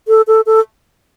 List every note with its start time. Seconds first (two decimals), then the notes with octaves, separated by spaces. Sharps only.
0.08 A4
0.27 A4
0.46 A4